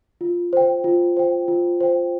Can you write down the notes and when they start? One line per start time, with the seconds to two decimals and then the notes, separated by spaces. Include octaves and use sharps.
0.21 F4
0.53 C5 G5
0.84 F4
1.17 C5 G5
1.48 F4
1.81 C5 G5